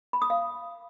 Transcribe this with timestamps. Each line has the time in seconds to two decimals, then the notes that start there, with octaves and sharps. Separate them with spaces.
0.13 B5
0.22 D#6
0.30 F5